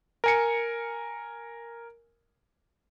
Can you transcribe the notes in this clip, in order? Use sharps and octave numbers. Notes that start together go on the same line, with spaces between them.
A#4 G#5 C#7